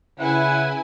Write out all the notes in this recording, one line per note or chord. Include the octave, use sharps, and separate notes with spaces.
C#3 E4 B4 F#5 G#5